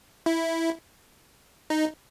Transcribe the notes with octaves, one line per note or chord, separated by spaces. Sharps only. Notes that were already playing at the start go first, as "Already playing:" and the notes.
E4
D#4